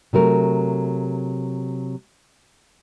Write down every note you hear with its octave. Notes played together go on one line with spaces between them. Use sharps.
C3 F#3 A3 A#4